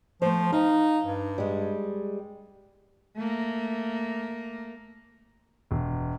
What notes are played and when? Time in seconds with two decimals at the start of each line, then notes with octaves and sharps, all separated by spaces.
0.22 F3 A3 C5
0.52 D#4 F5
1.06 G2
1.38 G3 G#3
3.17 A3 A#3
5.71 E1